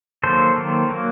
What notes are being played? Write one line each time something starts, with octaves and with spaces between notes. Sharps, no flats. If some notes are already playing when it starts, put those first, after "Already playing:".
D#3 F#3 A#3 A4 C5
D#3 F#3 A#3
F#3 A#3